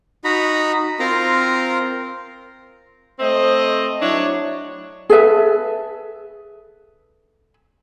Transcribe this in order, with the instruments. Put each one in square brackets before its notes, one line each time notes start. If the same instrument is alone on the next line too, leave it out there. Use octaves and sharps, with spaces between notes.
[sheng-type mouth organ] D#4 F#4 A#5 B5
C4 F4 A#4 F5 A#5
[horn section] A3 C4 C5 D#5
F#3 D4 E4 C#5
[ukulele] G#4 A4 B4 E5